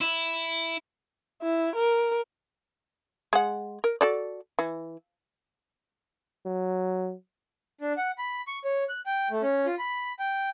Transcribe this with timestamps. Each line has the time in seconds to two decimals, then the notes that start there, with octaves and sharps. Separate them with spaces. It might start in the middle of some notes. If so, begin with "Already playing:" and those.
0.01 E4
1.42 E4
1.75 A#4
3.33 G#3 F#5
3.84 A#4
4.01 F#4 A4 D5
4.59 E3
6.46 F#3
7.81 D4
7.97 F#5
8.18 B5
8.47 C#6
8.64 C#5
8.89 F#6
9.06 G5
9.31 A3
9.42 C#4
9.66 F4
9.79 B5
10.19 G5